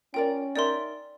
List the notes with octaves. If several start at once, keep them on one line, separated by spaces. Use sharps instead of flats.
C#4 F4 A#4 D5 G5
D#4 A#4 D5 E5 C6